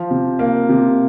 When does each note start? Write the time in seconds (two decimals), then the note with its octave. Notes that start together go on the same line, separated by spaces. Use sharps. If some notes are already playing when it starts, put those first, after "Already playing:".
Already playing: F3
0.11 C3
0.39 A#3
0.69 C3